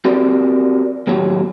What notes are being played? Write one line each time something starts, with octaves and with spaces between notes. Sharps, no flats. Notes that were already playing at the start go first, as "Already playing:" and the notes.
C4 F#4 G4 A#4 D5
D#2 A2 F#3 G4 C#5